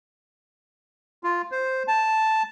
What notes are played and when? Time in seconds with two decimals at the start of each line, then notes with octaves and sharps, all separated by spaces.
1.24 F4
1.52 C5
1.88 A5